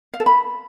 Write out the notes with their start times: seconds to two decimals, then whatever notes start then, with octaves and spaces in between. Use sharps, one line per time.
0.14 F5
0.20 A4
0.26 B5